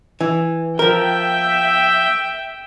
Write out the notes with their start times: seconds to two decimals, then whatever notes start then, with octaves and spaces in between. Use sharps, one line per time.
0.21 E3
0.79 F3 A#4 E5 G5